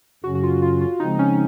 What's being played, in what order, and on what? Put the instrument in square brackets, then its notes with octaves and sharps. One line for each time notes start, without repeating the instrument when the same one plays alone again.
[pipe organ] F#2 C#3 F#3 C#4 [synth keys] F#4
[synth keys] F#4
F4
F4
F4
[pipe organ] C#3 F3 G#3 C4 [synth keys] D#4
[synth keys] D#4
C#4